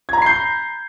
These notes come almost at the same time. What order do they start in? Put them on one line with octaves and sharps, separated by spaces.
G#6 A#5 B5 C7 G6